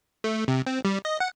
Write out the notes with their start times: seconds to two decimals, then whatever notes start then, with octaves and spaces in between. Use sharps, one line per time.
0.24 A3
0.48 C3
0.66 C4
0.85 G3
1.05 D#5
1.20 F#5